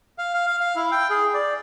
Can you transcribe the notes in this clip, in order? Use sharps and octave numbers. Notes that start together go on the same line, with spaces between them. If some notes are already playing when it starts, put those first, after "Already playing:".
F5
F5
F5
F5
E4
G5
G#4
D5